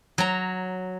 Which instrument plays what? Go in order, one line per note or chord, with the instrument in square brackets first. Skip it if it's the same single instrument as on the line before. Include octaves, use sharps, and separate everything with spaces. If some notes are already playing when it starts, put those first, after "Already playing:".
[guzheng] F#3 A#5